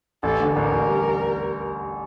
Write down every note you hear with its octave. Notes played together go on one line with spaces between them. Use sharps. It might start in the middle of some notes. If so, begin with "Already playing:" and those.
A1 A4
D3
A1 A#4
A1
G3